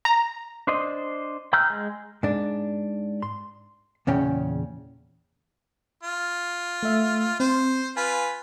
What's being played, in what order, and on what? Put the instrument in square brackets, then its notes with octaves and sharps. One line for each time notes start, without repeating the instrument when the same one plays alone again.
[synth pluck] A#5
[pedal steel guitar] D4 C5 D#5
G5 A#5 E6 F6 G6
G#3
[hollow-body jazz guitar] G#2 D4
C6
E2 A#2 C#3 C#4 G5
[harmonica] F4
[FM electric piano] A3 E5
[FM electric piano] C4 [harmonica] C5
[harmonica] F4 B4 [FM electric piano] G#5